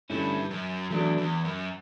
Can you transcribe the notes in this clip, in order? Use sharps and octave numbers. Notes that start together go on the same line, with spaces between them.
G2 D3 A3 C#4 E4
F#2
E2 F#3 A3 D4
E2
F#2